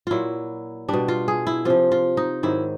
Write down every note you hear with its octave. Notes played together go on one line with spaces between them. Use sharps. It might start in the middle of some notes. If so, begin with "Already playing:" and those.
A#2 F#3 E4 F4
B2 G3 D4
F4
G#4
E4
C3 F3 F4
F4
D#4
G#2 D#3 F#3 E4